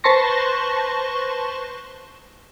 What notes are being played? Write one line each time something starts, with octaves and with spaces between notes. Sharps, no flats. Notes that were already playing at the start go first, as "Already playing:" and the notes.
B4 C5 A5 C6 C#6 A#6